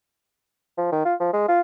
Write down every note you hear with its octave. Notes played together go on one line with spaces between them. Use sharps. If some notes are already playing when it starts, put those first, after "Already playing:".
F3
D#3
F4
F3
G#3
F4